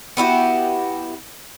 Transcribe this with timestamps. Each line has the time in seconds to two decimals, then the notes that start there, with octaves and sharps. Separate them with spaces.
0.17 B3 E4 F#4 G4